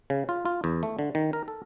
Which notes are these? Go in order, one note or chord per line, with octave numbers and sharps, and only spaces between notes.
C#3
F4
F4
E2
A3
D3
D#3
A#4
A4